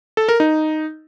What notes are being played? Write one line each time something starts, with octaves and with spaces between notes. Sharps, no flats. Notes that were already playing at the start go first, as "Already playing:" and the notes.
A4
A#4
D#4